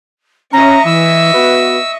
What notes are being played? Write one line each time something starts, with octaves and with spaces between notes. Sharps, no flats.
C#4 D#5 E5 A#5 C#6
E3 E6
B3 F#4 B4